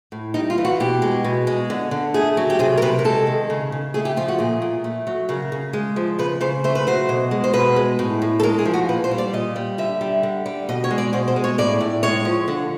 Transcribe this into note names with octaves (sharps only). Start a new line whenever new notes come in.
A2
G3 D#4
F4
E3
F#4
B2 G4
G#3
B2
G#3
D3
D3
A3 G#4
F#3
G4
C3 G#4
A#4
C3 B4
A#4
G#3 A4
D#3
C#3
C#3
A3 G#4
G4
F3 F4
F#4
A#2 G#4
A#2
A3
F#3
C#3 A#4
C#3
G#3
F3
C#3 B4
C#3 C5
A3 C5
B4
F#3 C5
B2
G#3
C5
B2 B4
G#3
A2
A2
A4
G#3 A#4
G#4
F3
F#4
A#2 B4
C5
G3
D5
A#2 D#5
G3
D3 E5
G3
D3
G3
B2 D#5
C#5
G#3
D5
B2 C5
C5
G#3
C#5
A2 D5
A2
G#3 C#5
F3
D3